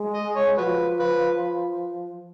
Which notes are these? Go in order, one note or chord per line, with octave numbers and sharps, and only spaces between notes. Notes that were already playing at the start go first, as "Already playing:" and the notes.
Already playing: G#3
D#5
C#5
F3 F#4 B4
B4